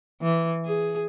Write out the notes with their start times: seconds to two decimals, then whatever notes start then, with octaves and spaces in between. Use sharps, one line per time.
0.22 E3
0.65 G#4